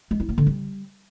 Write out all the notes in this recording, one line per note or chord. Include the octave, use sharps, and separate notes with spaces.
G#3
E4
A#3
D3
G3